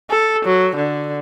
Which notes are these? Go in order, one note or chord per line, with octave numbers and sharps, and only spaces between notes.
A4
F#3
D3